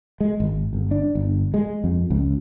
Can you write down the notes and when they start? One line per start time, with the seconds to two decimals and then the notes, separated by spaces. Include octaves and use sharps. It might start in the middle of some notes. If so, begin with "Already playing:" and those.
0.20 G#3
0.40 G#1
0.73 G1
0.91 D4
1.15 G1
1.54 G#3
1.84 F2
2.10 C#2